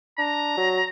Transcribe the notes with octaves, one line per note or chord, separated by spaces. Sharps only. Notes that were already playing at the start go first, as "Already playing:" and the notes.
D4 A#5
F#3